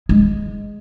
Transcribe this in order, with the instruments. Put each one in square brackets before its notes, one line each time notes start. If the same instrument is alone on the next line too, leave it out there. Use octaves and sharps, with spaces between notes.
[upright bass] G#3